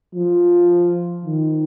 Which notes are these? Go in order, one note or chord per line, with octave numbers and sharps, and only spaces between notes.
F3
D#3